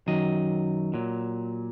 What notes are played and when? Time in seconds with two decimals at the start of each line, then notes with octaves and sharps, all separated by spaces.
0.07 F#2 D#3 F#3 D#5
0.94 A#2 F#3